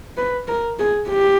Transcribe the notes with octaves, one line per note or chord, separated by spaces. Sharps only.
B4
A#4
G#4
G4